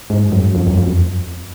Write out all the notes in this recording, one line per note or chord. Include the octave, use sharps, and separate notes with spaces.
G#2
F#2
F2
F#2
F2